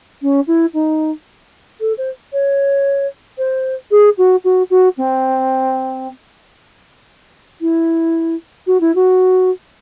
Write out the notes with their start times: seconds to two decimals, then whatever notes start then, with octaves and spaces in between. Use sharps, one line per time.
0.22 C#4
0.47 E4
0.74 D#4
1.81 A4
1.98 C5
2.33 C#5
3.38 C5
3.91 G#4
4.18 F#4
4.44 F#4
4.70 F#4
4.98 C4
7.61 E4
8.67 F#4
8.81 E4
8.95 F#4